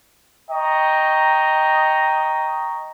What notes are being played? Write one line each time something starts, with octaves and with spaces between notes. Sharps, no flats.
D#5 G5 A#5 C#6